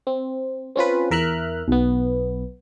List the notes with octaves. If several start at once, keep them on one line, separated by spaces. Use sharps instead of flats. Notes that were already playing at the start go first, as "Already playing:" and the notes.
C4
C4 C#4 F4 B4
E2 A#4 E5 F6 F#6
B1 B3